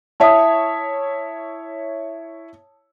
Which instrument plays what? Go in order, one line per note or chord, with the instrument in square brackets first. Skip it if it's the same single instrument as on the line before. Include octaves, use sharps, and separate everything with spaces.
[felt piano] E4 C#5 E5 [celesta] A5 D#6